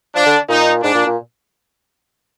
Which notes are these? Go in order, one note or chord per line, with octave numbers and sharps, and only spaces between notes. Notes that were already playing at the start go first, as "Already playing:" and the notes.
F3 D4
D3
A#2 D#4
G#2 D4
A#2
A#2